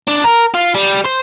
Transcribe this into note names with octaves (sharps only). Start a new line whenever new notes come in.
D4
A#4
F4
G3
C5